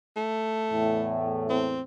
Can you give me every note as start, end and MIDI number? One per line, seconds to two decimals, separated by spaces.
0.16 1.21 57
0.71 1.81 40
0.71 1.81 45
1.49 1.81 60